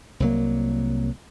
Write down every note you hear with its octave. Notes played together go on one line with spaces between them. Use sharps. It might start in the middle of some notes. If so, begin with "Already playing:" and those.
C2 F#3 A#3